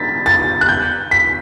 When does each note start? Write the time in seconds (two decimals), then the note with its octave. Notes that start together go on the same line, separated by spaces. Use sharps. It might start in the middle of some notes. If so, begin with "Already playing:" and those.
Already playing: A6 B6
0.26 A6
0.61 F#6
0.69 G6
1.11 B6